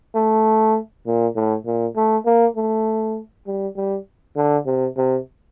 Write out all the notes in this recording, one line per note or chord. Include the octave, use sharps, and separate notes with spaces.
A3
A#2
A2
A#2
A3
A#3
A3
G3
G3
D3
C3
C3